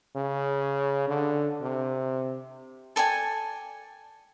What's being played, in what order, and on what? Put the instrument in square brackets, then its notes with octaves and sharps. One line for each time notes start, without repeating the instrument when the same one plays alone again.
[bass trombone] C#3
D3
C3
[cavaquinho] A4 D5 G5 G#5